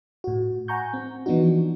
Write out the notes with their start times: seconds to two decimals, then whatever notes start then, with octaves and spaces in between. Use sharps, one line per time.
0.24 A2 F#4
0.68 F#5 G#5 A#5 C#6 G6
0.93 C4
1.26 E3 F3 B3 D4 D#4 F#4